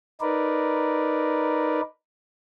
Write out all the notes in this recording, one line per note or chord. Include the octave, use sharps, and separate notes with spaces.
D#4 A#4 B4 D5